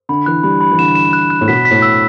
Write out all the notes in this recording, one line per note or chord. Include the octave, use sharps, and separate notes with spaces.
D3 B5
E3 F#6
G3 B5
B5
E3
D3 E7
E7
F#6
F#6
A2
B2 B6
B6
A2
E6